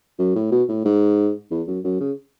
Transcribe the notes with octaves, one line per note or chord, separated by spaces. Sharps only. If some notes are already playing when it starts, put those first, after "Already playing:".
F#2
A2
B2
A2
G#2
E2
F#2
F#2
C#3